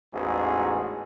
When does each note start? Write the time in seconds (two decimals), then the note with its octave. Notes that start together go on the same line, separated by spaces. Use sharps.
0.13 A1 E2 G#2 F#4 G#4